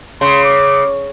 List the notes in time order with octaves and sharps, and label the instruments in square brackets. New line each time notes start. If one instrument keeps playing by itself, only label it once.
[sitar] C#3 [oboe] C6
[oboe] D6